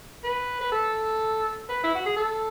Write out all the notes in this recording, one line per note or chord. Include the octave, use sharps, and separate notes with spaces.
B4
B4
A4
B4
E4
F#4
G#4
A4